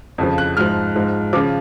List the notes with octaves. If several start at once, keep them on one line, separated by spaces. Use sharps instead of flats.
F2 C#3 F3
F#6
G#2 F3 F6
G#2 F3
C#3 F3 D6